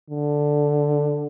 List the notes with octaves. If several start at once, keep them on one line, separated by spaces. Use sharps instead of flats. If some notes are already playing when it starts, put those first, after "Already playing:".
D3